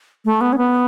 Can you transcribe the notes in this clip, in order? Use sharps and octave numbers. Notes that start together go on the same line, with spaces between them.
A3
B3
C#4
B3